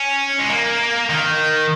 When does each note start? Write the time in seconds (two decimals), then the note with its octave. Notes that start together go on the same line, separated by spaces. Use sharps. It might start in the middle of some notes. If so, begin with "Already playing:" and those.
Already playing: C#4
0.40 G#3
0.50 A#3
1.10 D#3